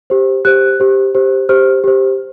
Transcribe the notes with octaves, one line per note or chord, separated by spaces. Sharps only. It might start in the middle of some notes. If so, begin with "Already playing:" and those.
G4 C5
G4 C5 F#6
G4 C5
G4 C5
G4 C5 F6
G4 C5